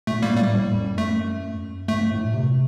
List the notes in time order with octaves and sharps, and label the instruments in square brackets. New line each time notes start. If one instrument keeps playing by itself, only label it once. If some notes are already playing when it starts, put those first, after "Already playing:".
[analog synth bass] A#2 [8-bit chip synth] A3
[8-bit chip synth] G3 A#3
[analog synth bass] A2
[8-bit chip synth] G3
[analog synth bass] A2
F#2
[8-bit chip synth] A3
[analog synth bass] G2 [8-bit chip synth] A3
[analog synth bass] A2
A#2
C3